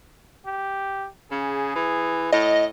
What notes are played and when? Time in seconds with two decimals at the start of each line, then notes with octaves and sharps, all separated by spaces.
0.46 G4
1.31 C#3 G#4
1.75 E3
2.32 A2 D#5